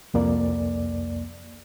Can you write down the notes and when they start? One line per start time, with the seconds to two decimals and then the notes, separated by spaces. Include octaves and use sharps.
0.14 C2 F2 A#3 D5